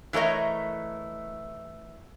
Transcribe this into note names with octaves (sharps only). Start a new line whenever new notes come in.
E3 A3 A#4 C#5 D#5